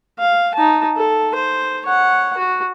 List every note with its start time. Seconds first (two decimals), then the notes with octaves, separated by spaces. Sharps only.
0.19 F5
0.55 D#4 A5
0.96 A4
1.35 C5
1.85 C#5 F#5
2.38 F#4